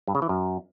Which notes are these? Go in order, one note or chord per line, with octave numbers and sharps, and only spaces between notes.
G2
C#3
E3
F#2